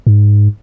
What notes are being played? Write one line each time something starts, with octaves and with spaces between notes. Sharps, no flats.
G#2